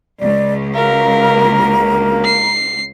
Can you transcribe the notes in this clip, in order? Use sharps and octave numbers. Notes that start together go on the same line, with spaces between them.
C#2 D5
F#4 A#4 E5 F5 A#5
D2 A#3
C7